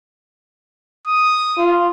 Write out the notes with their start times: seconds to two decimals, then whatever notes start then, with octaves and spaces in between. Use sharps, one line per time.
1.07 D#6
1.58 F4